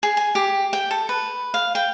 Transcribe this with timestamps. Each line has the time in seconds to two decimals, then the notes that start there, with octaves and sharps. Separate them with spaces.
0.03 G#4
0.17 G#5
0.35 G4
0.73 G5
0.91 A4
1.09 B4
1.54 F5
1.75 G5